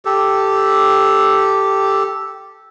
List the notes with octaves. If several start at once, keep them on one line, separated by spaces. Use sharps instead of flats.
G4 A4